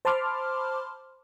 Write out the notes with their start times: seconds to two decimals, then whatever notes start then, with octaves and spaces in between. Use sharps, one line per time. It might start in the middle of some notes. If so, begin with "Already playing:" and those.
0.05 C5 A5 B5 C6 D6 F6